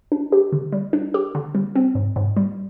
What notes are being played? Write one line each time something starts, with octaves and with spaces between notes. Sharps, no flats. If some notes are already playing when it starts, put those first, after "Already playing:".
D4
G4
D3
G3
D4
G4
D3
G3
C4
G#2
G#2
G3